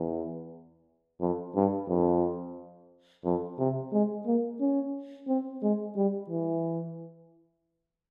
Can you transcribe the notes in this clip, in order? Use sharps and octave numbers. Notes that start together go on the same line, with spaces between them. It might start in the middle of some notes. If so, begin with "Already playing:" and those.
Already playing: E2
F2
G2
F2
F2
C3
G#3
A#3
C#4
C4
G#3
G3
E3